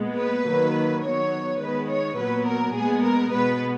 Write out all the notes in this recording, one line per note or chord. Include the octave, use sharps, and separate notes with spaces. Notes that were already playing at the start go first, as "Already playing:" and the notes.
Already playing: A#2 G#3 B3
B4
D#3 F#3 A#3
D#3 F#3 B3 C#5
D#3 G#3 B3 B4
C#5
A#2 F#3 B3 B4
A#4
A#2 G#3 B3 G#4
A#4
B2 G#3 B3 B4